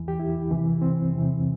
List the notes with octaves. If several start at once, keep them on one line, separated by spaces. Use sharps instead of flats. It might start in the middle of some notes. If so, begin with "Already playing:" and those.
Already playing: E2 E3
G4
E4
C2 C3 E3
C4
E2 C3 E3